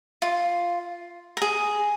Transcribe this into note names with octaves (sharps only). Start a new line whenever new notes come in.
F4
A#4
G#4